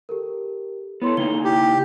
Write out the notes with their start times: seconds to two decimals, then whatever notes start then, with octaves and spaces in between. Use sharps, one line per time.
0.09 G4 A4 A#4
1.02 B3 E4 A4 C#5 C6
1.17 C#3 A#3 D#4 G7
1.45 E4 G4